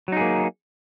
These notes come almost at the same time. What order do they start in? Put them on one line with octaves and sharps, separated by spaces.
F#3 D#4 G#4 A#3